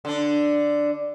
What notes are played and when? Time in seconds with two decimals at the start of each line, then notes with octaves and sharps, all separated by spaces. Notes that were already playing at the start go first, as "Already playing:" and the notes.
0.05 D3 D4